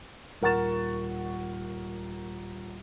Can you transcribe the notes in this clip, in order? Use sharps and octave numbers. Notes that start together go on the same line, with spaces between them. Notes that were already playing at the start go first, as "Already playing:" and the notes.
D#1 A#4 F#5 C#6 A6 E7